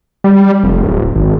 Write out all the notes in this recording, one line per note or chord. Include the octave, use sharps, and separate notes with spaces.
G3
F1
D1
G#1